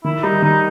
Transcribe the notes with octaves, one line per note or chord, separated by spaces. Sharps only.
D#3 E4
G3 D#4
D#3 D#4